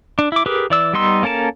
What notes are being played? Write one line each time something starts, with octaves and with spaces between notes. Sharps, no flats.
D4
E4 D6
G4 G#4 A#4 B4
E3 D5 E6
G3 B3 D#4 C6 E6
A#3 C#4 A4 A#4 A5